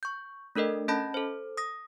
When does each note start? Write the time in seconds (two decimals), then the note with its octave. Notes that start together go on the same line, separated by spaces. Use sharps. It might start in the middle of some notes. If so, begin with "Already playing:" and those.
0.03 C#6 G6
0.56 A3 D4 A4 A#4 D#5
0.88 C#4 D#5 A5 B5 G6 A#6
1.14 A4 C5
1.57 D#6 A#6